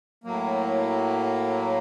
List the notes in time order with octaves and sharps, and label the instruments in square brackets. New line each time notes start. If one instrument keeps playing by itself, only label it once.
[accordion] A2 F#3 A#3